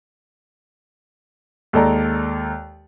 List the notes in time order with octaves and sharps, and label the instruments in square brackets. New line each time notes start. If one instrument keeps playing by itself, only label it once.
[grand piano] D#2 G#3 A4 D5 A#5